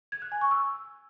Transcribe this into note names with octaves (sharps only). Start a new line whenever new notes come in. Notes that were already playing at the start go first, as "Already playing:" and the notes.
G#6
F#6
G#5
C#6
E6